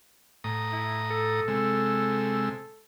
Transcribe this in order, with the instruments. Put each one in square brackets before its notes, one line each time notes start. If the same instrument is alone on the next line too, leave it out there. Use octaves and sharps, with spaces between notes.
[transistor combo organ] A2 A#5 D#6
[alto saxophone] E4
A4
[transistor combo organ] C3 G#3 E6